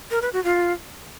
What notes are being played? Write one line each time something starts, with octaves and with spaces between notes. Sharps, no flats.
A#4
B4
F#4
F4